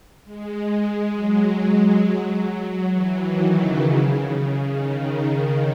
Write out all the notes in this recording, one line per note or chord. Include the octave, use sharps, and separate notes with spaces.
G#3
G#3
F#3
E3
D#3
C#3
D#3